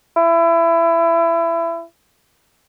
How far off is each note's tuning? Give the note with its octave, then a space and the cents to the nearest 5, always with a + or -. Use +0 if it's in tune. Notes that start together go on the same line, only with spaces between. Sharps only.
E4 +25